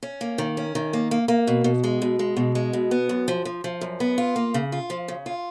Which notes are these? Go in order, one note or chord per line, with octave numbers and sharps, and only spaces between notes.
C#4
A#3
D#3
C#4
D#3
A#3
A#3
A#3
B2
B2
G#3
B2
G#3
B2
G#3
B2
B3
F#2
F3
F3
F3
F#2
B3
F4
A#3
C#3
F4
F3
C#3
F4